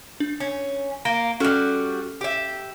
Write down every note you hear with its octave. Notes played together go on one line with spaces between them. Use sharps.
D4
C#4
A#3 A#6 D7 G7
G3 C#4 F#4 A4 F6
G4 E5